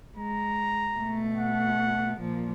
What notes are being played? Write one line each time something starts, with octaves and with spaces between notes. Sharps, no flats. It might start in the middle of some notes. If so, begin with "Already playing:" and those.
G#3 A#5
B2 A3
F#5
A#2 F3